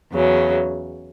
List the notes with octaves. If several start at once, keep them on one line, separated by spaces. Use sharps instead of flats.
E2 C#3 F#3 C#4